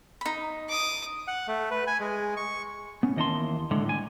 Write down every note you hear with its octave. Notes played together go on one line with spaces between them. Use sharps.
D#4 B5
D6 D#6
F#5
A3
B4
G#5
G#3
C#6
B3 C#4
D#2 E3 D#5 F#5 A5 C6
A2 D3 G#3
A2 G#5